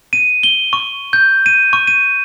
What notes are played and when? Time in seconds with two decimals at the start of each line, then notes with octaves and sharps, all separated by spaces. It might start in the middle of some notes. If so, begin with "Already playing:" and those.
0.13 D#7
0.43 G7
0.73 C#6
1.13 G6
1.46 D#7
1.73 C#6
1.87 D#7